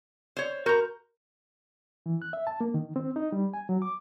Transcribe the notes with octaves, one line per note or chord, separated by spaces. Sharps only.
C5 C#5
F#4 A#4 A#5 G6
E3
F#6
E5
A5
A#3
D#3
C4
D#4
G3
G#5
F#3
D6